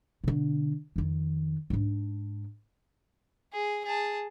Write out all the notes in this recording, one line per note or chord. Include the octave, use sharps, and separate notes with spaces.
B2 D3
F2 D#3
G#2 D4
G#4
G#4 A5